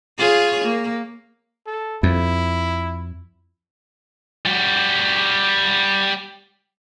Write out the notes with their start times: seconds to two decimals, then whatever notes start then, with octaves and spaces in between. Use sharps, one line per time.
0.18 F4 G#4 C#5
0.65 A#3
1.66 A4
2.03 F2 E4
4.45 G3 F#4